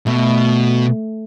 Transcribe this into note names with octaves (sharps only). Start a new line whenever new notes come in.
B2 A3